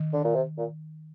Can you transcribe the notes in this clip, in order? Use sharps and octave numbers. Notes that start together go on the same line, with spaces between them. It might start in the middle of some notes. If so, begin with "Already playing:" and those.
Already playing: D#3
D3
A#2
C3
A#2